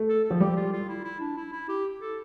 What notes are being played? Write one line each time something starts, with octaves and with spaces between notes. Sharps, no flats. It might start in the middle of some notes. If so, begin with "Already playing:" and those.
Already playing: A3
A4
A4
F3
G3 G4
F4
F4
E4
E4
D4
E4
E4
G4
A4